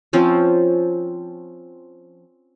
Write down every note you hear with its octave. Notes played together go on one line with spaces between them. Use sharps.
F3 C4 C#4